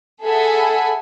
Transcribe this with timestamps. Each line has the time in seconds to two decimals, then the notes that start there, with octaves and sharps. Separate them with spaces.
0.22 G#4 A4 E5 F#5 G#5 B5